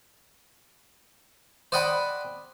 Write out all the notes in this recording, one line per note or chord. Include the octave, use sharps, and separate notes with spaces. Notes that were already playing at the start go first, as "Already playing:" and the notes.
C5 D5 D#5 F#5 G5 B5